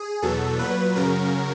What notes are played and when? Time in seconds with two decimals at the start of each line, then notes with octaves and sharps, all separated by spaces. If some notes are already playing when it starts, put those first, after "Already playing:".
Already playing: G#4
0.22 E2 B2 F#3 A4
0.59 A#2 F#3 B4
0.96 F#2 C#3 F#3 A#4